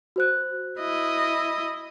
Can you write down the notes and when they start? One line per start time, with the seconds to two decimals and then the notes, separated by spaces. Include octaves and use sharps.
0.16 F#4 C5 F#6
0.80 E4 D#5